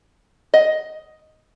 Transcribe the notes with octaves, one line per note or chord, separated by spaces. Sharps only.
D#5